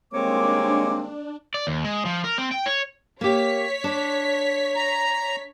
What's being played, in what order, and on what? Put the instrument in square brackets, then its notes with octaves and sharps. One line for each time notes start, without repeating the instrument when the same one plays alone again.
[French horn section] D#3 G3 G#3 [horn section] A#3 C4 [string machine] D4 [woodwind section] C#5 D6
[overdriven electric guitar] D5
D#2
G#3
F3
A#4
C4
G5
C#5
[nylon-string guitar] A#3 G4 [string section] C#5 B6
[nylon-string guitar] D4
[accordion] A#5